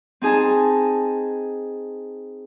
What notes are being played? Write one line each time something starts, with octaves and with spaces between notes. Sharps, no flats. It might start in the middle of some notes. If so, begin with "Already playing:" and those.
C4 D#4 G#4 G#5 A5